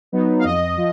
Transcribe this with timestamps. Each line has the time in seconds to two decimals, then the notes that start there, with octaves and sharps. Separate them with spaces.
0.12 F#3 B3 D#4
0.39 F5
0.44 F2 D#5
0.77 F3